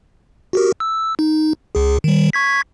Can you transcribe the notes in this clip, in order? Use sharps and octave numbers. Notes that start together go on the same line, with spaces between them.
F#4 G4 A#4
E6
D#4
C#2 G#4
D#3 G3
C#6 G#6 B6